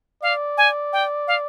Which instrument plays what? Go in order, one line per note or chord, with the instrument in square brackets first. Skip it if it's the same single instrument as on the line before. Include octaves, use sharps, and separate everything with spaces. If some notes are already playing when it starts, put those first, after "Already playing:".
[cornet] D5 [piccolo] F5
[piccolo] G#5
G5
F5